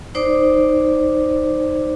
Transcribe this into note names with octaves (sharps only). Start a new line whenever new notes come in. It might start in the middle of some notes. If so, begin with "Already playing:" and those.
D#4 C5 D5 D6